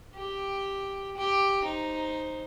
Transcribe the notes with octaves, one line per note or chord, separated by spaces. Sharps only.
G4
G4 D6
D#4 C5